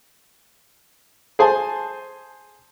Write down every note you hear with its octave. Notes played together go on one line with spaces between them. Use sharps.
G#4 C5 G#5 A5